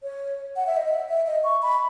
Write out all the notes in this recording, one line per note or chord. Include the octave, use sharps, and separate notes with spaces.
C#5
F#5
E5
D#5
E5
E5
D#5
C#6
B5